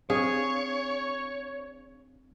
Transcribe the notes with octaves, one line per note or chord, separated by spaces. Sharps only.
C4 D4 G#4 C#5 F5